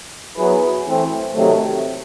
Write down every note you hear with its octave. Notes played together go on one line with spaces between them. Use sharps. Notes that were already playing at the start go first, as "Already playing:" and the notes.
F#3 B3 E4 G#4 B4
E3 A3 C4
C3 D#3 F#3 A3